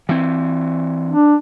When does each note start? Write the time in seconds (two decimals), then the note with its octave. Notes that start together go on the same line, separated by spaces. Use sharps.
0.09 E3 C4
1.11 D4